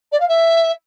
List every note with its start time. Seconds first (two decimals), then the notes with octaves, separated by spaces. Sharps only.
0.12 D5
0.20 F5
0.28 E5